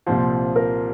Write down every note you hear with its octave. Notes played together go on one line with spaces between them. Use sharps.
C2 A#2 F3 C5
A#4